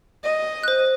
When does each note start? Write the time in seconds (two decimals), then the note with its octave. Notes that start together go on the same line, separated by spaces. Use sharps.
0.24 D#5
0.63 C5 F#6